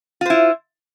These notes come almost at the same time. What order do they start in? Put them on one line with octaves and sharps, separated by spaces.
F4 C5 E4